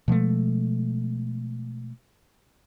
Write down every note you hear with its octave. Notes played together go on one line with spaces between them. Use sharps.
B2 F3 G#3 A3